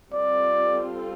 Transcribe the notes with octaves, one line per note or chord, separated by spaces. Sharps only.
G3 C4 F4 A4 D5